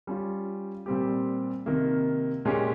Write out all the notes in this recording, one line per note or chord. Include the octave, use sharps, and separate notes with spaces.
G3 C#4 F4
A#2 G3 C4 G4
C3 D#3 A#3
A#2 G#3 C#4 G4